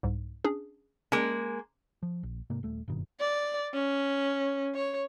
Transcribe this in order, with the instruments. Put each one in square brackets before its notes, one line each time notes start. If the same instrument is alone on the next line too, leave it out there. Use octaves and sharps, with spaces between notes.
[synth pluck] C2 G#2
C#4 D4 G#4
[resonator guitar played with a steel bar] G#3 A#3 [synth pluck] C#4
[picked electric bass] F3
A#1
G#2 C3 A#3
D#1 A3
F#1 G2 B2 D#3
[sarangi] D5
C#4
C#5